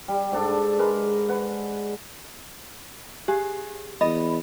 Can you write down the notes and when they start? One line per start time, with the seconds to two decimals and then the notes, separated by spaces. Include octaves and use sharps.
0.08 G3
0.32 G#2 D4 A4
0.79 G#3 A#4 B4
1.28 B4 F#5
3.28 G4 G#4
4.01 E2 D#5 B5